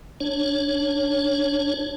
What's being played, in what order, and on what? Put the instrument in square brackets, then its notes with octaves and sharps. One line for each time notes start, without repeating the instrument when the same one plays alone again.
[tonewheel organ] D4 C#5